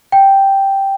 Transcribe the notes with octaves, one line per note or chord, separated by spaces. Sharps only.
G5